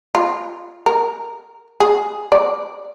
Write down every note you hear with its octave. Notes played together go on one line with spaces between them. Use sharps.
F4
A#4
G#4
D5